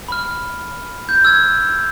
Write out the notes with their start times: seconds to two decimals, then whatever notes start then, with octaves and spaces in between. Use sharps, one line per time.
0.08 B5 F6
1.09 G6
1.25 E6 F6 G#6